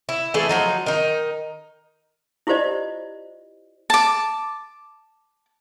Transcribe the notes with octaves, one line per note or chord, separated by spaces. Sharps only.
E4
E3 A3 G#4 A4
F3 F#3 D#4
D#3 D#4
E4 F4 G4 C5 D5 D#5
A5 D6